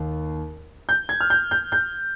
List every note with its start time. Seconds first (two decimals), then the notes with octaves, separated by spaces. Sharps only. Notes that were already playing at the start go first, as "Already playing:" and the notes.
Already playing: D#2
0.89 G6
1.09 G#6
1.21 F6
1.30 G6
1.51 G6
1.72 G6